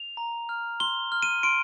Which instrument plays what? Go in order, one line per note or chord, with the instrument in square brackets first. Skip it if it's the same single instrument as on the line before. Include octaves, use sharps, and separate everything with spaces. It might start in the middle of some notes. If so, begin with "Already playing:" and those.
Already playing: [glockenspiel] F7
A#5
F6
C6 G7
F6
D#7
C6 D7